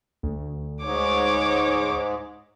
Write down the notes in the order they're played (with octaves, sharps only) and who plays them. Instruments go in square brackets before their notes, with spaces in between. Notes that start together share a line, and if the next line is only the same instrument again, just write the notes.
[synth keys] D2
[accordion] G#2 [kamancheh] C#5 D6